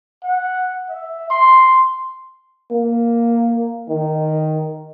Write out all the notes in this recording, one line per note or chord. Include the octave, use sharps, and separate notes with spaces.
F#5
E5
C6
A#3
D#3